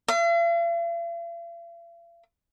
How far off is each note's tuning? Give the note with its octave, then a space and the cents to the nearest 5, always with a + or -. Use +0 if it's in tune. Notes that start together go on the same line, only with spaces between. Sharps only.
F5 -45